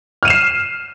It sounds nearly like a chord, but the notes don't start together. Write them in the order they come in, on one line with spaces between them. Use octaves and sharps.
F6 D#7 E7 C7